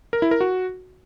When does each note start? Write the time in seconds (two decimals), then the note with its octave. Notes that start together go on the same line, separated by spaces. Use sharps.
0.13 A#4
0.22 E4
0.31 A#4
0.41 F#4